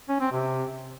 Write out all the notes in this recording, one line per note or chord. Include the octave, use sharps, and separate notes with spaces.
C#4
C4
C3